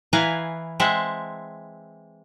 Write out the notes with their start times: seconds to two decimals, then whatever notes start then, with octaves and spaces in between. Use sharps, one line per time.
0.13 E3 E4 B4 F5 G#5 A#5
0.80 G#3 C4 E5 F#5 A5